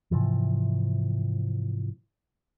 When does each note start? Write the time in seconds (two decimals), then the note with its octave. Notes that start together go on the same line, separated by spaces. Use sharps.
0.11 G#2 C3 E3 F3